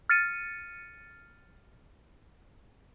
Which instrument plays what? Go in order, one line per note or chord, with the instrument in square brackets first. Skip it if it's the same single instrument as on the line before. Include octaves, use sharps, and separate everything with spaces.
[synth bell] F6 A6 C#7 D#7